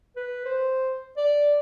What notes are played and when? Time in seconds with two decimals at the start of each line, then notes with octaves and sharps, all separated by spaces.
0.16 B4
0.45 C5
1.17 D5